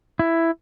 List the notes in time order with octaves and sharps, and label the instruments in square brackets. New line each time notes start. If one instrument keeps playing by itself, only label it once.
[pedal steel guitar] E4